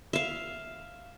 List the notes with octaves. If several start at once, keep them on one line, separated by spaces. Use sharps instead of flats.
E5 F5